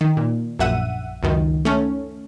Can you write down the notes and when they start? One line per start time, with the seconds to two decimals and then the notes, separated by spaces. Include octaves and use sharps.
0.01 D#3
0.17 A#2
0.59 A#1 F#2 E5 F#5 D#7
1.23 C#2 F#2 D#3
1.65 A3 C#4